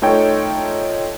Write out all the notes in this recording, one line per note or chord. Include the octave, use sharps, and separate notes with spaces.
A3 D#4 F4 A4 C#5 G5